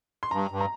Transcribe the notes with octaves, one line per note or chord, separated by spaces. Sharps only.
C6
G2 A#5
G2
A#5